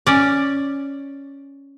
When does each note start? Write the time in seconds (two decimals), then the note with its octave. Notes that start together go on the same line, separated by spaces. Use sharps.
0.07 C#4 D5